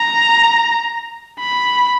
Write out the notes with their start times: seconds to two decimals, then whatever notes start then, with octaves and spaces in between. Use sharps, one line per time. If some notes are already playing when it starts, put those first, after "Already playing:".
Already playing: A#5
1.39 B5